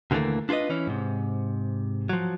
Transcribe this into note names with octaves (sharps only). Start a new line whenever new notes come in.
D#2 D3 E3 F#3 A3 A#3
D4 F4 G#4 B4 D#5
E3 C#4
G#2 C3
F3 F#3